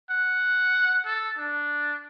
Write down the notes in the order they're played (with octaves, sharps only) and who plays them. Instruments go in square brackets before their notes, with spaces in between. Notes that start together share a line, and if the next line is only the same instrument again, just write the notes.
[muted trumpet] F#5
A4
D4